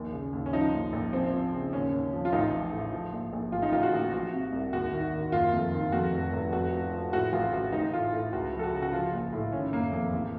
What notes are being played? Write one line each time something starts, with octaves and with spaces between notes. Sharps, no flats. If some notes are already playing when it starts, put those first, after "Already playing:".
Already playing: A#1 D#2
C#3
D#2
C#4
F3 D#4
A#1
A#1
F3 C4
F3
C#3
D#2 C#4
D#2
F3
F4
A1 D#4
F3
A2
F3
A#1
A#1
A1 F4
D#4
A1 F4
F#4
A1
F3 F#4
C3
C2
D#2 F#4
D#3
D#3
F#1 F4
F2
D#3
F2 F#4
F1
F1
F2 F#4
F3
F3
A2 F#4
A1 F4
A1 F#4
A1 D#4
A2 F4
A2
C#2 F#4
F3
A4
F#4
C#3
F#4
F3 F4
A#1
A2
D#3 C#4
F#1 A#3
F2 A#3
A1